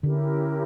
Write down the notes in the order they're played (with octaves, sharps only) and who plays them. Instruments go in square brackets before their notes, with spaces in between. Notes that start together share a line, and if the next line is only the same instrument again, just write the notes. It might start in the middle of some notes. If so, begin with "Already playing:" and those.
[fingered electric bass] D3 [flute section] C#4 E4 G4 A#4